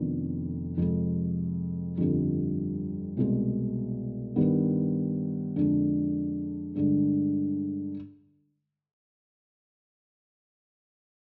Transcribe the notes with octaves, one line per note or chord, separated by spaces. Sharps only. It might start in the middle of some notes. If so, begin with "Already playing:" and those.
Already playing: F1 F2 D#3 B3 D4
F2 C3 F3 G#3
G1 F2 D3 G3
C2 B2 G#3
G2 D#3 G3 B3
F2 D3 G#3 D4
G2 D3 G#3 D4